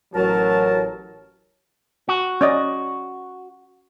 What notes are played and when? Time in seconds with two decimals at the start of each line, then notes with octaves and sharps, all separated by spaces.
0.15 A1 F#3 A#4 A5
2.09 F#4
2.41 C#4 D5 D#5